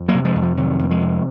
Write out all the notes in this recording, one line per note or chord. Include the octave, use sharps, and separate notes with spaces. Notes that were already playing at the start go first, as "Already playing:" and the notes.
Already playing: F2
F#3 A#3
C3
F3 G#3
F2
F3
C3 D#3 F#3
F2 A#3
F3 G#3
C3